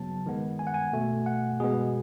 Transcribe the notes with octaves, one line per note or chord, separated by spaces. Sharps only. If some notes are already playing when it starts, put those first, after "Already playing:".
Already playing: C#3 F#3 B3 A5
D#3 G#3 B3
G#5
F#5
G#5
B2 A3
F#5
B2 G#3 B3 G#4